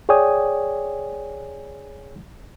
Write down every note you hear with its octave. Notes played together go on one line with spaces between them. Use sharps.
G#4 C#5 D5 G5 G#5 D#6